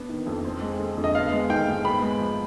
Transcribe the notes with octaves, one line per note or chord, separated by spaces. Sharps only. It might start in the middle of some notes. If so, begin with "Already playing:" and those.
Already playing: B3 D4
D#3
F2
C4
G#3
D3
F2
D#5
B3 F5
G#3
D#3 G5
G#2
B3 B5
G#3
F3